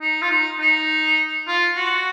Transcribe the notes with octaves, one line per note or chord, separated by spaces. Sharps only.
D#4
F4
D#4
D#4
F4
F#4